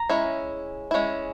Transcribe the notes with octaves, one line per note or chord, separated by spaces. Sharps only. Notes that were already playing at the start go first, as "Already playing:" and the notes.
Already playing: A#5
G#3 C#4 E4
G#3 C#4 E4